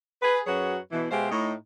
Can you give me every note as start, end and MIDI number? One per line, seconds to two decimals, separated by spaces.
0.23 0.40 68
0.23 0.40 71
0.47 0.77 42
0.47 0.77 54
0.47 0.77 66
0.47 0.77 68
0.47 0.77 71
0.47 0.77 73
0.92 1.08 47
0.92 1.08 52
1.11 1.31 47
1.11 1.31 56
1.11 1.31 67
1.11 1.31 72
1.11 1.31 76
1.11 1.31 77
1.31 1.53 45
1.31 1.53 63